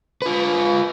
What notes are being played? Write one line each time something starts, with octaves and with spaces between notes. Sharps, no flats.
F4 B4